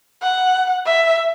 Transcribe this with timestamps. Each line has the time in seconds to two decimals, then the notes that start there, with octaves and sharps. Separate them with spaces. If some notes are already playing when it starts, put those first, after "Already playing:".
0.22 F#5
0.86 E5